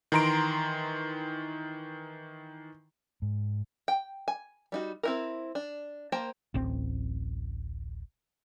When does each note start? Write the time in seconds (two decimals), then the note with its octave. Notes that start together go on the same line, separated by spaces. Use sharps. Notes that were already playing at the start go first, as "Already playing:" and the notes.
0.12 D#3 E3 A#5 C6 D7
3.22 G#2
3.88 G5
4.28 G#5
4.72 G3 D#4 F#4
5.03 C4 E4 A#4
5.55 D4
6.12 A#3 C5 G5 A5
6.54 D1 A1 C4